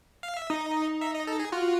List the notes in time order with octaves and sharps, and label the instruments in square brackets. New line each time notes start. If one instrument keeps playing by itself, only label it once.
[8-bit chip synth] F5
E5
[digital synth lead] D#4 [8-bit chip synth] D#5
[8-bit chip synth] E5
D#5
A4
G#4
[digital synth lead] F4 [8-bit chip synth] F#4